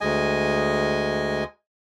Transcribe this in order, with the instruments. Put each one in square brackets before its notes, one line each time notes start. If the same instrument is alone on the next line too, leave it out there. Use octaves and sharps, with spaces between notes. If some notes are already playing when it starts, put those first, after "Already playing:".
[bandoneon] D2 G#3 D#5 G#5